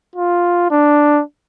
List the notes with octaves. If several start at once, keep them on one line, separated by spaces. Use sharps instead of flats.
F4
D4